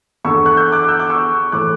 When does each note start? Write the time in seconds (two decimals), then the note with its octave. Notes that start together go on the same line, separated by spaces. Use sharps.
0.25 E2 D3 C#6 E6
0.46 F#6
0.57 E6 G6
0.72 D6 F#6
0.88 E6 G6
0.99 D6 F#6
1.10 C#6 E6
1.52 A2 E3 D6 F#6